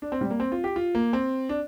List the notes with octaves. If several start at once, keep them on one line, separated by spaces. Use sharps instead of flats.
D4
C4
G3
A#3
C4
F4
G4
F4
A#3
C4
D4